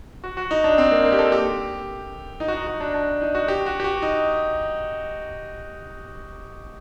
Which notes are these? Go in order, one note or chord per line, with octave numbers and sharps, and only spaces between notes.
F#4
F#4
D#4
D4
C4
A#3
A#3
G4
A4
G4
D#4
F#4
D#4
F#4
D4
D4
D#4
F#4
G4
F#4
G4
F#4
D#4